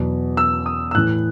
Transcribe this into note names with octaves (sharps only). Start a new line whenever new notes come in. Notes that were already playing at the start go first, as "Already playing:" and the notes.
Already playing: E2 B2 F#3
E6
D#6
E6
A2 E3 F#6